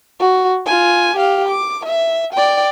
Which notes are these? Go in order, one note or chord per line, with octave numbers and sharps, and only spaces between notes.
F#4
F4 G#5
G4 F5
D6
E5
D5 G5